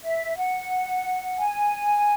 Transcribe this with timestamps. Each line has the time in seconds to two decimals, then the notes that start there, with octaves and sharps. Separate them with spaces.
0.03 E5
0.36 F#5
1.38 G#5